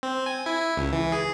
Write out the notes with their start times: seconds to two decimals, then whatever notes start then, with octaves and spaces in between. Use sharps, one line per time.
0.03 C4
0.26 G#5
0.46 E4
0.60 E4
0.77 C#2
0.92 E3
1.12 G#4